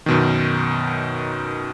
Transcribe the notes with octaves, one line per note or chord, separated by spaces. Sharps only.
F#2 B2 D#3